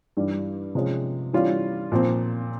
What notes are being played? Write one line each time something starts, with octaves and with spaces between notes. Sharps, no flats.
G2 E3 G3
C3 F3 G#3 C#4
E3 G3 C#4 F4
A#2 F3 C4